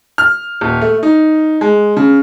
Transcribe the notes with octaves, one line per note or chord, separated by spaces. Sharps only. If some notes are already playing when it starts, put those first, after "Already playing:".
F6
D#1
A3
D#4
G#3
C#3